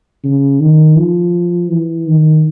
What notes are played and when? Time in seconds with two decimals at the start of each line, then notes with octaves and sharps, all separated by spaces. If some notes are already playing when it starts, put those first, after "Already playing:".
0.24 C#3
0.60 D#3
0.98 F3
1.70 E3
2.08 D#3